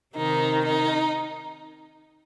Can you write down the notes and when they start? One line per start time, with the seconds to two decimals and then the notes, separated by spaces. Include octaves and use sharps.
0.16 C3 D#3 D#4
0.65 D#4